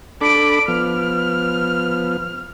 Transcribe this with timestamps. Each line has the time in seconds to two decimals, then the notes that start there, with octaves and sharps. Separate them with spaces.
0.21 D4 A4 B5 D6 D7
0.68 F3 B3 F6